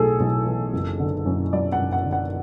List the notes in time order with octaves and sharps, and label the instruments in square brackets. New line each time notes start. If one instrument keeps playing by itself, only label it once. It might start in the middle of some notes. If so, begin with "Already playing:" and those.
Already playing: [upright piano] B1 A2 G#4 A4
B1
E3
F#1
D3
F#2
F#3 D5
F#5
F#1
F#5
D3
F#5